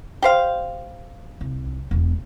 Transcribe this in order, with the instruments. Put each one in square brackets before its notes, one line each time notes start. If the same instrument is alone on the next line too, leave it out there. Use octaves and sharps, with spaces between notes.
[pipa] G4 C5 F5
[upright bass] C2
E1 B3